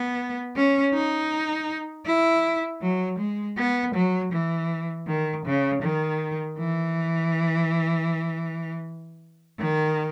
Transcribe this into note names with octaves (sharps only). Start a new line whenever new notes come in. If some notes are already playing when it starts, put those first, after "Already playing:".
Already playing: B3
C#4
D#4
E4
F#3
G#3
B3
F#3
E3
D#3
C#3
D#3
E3
D#3